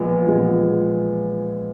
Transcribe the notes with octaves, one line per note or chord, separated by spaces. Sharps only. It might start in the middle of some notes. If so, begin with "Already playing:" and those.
Already playing: A#1 A#2 G#3 B3
A#1 A#2 G#3 B3